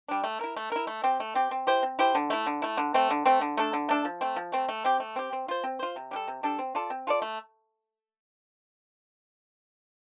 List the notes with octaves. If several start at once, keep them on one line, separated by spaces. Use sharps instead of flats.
G3 D4
A3
E4 A#4
A3
E4 A#4
A3
C4 G4
A3
C4 G4
C4
E4 G4 C5
C4
E4 G4 C5
D3
A3 E4
D3
A3 E4
D3
A3 C4
D3
A3 C4
D3
A3 D4 A4
D3
A3 D4 A4
F3
A3 C4
F3
A3 C4
A3
C4 G4
A3
C4 G4
C4
F4 C5
C4
F4 C5
C3
G3 D4 A4
C3
G3 D4 A4
C4
F4 A4 D5
C4
F4 A4 D5
A3